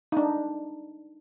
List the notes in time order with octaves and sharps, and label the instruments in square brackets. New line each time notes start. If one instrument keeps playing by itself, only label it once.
[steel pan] D4 D#4